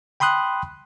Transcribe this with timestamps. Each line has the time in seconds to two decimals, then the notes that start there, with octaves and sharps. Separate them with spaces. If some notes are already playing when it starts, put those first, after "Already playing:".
0.20 G5 B5 C6 D#6 F#6